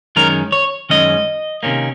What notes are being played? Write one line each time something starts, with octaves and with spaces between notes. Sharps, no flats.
F#2 D#3 G#3 C#4 A#4
C#5
F#2 D#3 G#3 C#4 D#5
C3 D#3 A#3 C#4